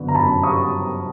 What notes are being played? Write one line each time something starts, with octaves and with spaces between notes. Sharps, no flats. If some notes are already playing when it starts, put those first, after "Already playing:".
Already playing: F#2 D3 B3
A#5
F#2 A5 B5
G3 C#6 D#6